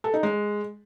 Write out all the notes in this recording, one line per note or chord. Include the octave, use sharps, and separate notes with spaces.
A4
D#4
G#3